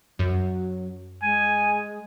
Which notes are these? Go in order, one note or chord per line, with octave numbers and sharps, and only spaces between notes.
F#2 F#3
G#3 G#5